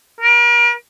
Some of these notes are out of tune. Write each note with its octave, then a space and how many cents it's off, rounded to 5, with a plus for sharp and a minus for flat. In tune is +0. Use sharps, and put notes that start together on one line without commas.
A#4 +40